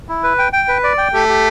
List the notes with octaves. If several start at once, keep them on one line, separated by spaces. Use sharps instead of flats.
E4
B4
G5
G5
B4
D5
G5
A3 G4
G4